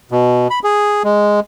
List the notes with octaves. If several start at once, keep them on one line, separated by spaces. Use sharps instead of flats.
B2
B5
G#4
G#3